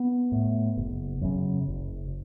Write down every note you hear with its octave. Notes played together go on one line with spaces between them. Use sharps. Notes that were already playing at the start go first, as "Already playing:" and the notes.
Already playing: B3
A2
F#1
F#2 C#3
F#1